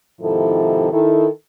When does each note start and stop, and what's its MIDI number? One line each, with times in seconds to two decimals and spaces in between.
0.21 0.90 44
0.21 0.90 48
0.21 0.90 51
0.21 0.90 53
0.21 0.90 64
0.21 0.90 69
0.92 1.27 51
0.92 1.27 64
0.92 1.27 69